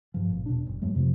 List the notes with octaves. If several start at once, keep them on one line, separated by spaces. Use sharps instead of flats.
G2 F3
G#1 A#2
E1 B2 D4
F#1
F#2 F#3 G#3 A3
F2 C3 F3